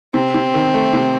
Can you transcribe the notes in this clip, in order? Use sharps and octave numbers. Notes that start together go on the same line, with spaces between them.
C3 C4
C3
D#3
A3
C3